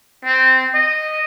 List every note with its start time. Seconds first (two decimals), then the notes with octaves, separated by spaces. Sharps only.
0.25 C4
0.74 D#5